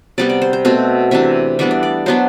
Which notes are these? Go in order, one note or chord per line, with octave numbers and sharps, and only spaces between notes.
C3 G3 B3 D5
D5
C5
C5
B2 A3 C4 C5
C3 E3 A3 D4 E5
E3 G3 B3 D4 E5
D5
D5
F#3 B3 D4 C5